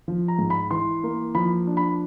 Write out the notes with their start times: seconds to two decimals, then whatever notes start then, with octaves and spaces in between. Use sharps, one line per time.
0.08 F3
0.28 A#5
0.39 G#2
0.50 B5
0.71 E3 C6
1.03 A#3
1.35 F3 B5
1.67 D4
1.77 B5